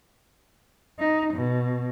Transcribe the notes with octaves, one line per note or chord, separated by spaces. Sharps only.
D#4
B2